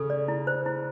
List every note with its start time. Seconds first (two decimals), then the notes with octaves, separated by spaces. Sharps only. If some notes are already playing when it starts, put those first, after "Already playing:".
Already playing: C#3 A4
0.10 D5
0.28 E4
0.47 C5
0.66 E4